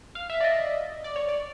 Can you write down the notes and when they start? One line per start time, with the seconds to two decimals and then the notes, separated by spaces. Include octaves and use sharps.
0.15 F5
0.30 E5
0.41 D5
0.44 D#5
1.04 D5
1.16 C#5
1.29 D5